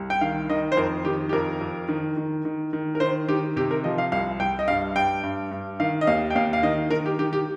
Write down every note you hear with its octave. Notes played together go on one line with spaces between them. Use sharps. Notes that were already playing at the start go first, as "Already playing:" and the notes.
Already playing: C2
G5
D#3 F5
D#3 D#5
C5
F2 A#4
D#3 G4
G4
F2 A#4
F2
D#3
D#3
D#3
D#3
A#4
D#3 C5
D#3 G4
C3 G4
A#4
F3 D#5
F5
C2 F5
C2 G5
D#5
G2 F5
G2 G5
G2
G2
D#3 F5
D#5
D#2 F5
G5
D#2 F5
F5
D#3 D#5
D#3 A#4
G4
D#3 G4
G4